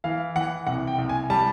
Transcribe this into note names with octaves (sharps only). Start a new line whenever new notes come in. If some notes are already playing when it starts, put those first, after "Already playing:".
E3 F5
E3 F#5
C2 F#5
G5
C2
G#5
G3 A5